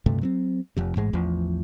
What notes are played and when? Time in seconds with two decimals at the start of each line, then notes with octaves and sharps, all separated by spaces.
0.06 D2 G2 C3 A3
0.22 F#3 B3 C4
0.77 F1 F2 C3
0.96 A1 G#2 G#3
1.13 A1 E2 F3